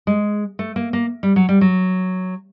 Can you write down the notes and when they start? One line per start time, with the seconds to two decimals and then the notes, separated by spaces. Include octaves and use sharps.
0.07 G#3
0.59 A3
0.76 A#3
0.93 A#3
1.23 G3
1.36 F#3
1.49 G3
1.61 F#3